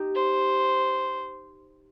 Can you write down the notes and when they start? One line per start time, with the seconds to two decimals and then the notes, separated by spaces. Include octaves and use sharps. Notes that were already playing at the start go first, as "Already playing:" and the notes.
Already playing: D#4 G4
0.15 C5